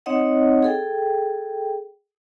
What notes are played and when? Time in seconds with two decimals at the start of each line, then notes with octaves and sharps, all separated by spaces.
0.06 C4 D#4 C#5 D#5 F#5
0.63 G#4 A4 G5